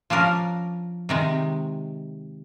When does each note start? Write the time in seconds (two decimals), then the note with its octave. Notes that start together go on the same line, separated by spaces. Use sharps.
0.10 F3 C#4 D4 A#4
1.09 C3 D#3 G#3